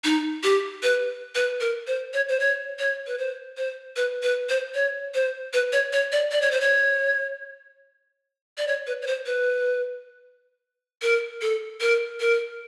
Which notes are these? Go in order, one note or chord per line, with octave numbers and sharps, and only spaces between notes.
D#4
G4
B4
B4
A#4
C5
C#5
C5
C#5
C#5
B4
C5
C5
B4
B4
C5
C#5
C5
B4
C#5
C#5
D5
D5
C#5
C5
C#5
D5
C#5
B4
C#5
C5
B4
A#4
A4
A#4
A#4